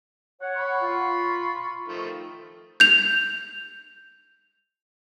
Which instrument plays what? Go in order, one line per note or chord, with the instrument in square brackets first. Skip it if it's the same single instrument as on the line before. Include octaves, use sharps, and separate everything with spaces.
[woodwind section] C#5 F#5
[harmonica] B5 C#6
[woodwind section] F4
[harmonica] D#3 F3 A3
[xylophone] G6 F7